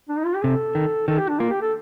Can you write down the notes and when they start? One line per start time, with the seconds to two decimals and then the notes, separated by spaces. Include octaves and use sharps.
0.09 D4
0.18 D#4
0.26 F4
0.35 G4
0.44 C3 A4
0.75 D#3
1.07 D#3 A4
1.18 G4
1.29 D4
1.39 A#3 F4
1.50 G4
1.62 A4